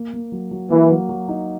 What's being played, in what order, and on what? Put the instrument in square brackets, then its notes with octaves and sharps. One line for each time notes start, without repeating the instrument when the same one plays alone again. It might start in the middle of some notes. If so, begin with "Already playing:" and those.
Already playing: [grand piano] A#3
A#3
F#3
F#3
[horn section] E3 [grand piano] A#3
[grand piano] F#3
F#3
D#4